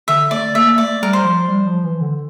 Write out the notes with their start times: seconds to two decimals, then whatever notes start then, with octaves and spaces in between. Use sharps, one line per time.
0.08 D3 E5
0.31 A3 D5
0.55 A#3 E5
0.78 A3 D5
1.02 G3 A#4
1.13 C5
1.24 F3
1.48 G3
1.66 F3
1.84 E3
2.01 D3